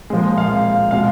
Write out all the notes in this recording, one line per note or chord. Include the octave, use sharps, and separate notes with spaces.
A#2 F3 G#3
F5
B2 G#3 F5